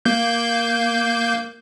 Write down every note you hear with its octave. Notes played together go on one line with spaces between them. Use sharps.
A#3 G6